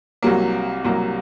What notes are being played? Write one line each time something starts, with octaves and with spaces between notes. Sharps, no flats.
C2 C3 F#3 A#3
C2 C3 F#3 A#3